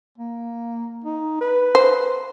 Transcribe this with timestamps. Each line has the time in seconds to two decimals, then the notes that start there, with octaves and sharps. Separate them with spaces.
0.18 A#3
1.05 D#4
1.41 B4
1.75 C5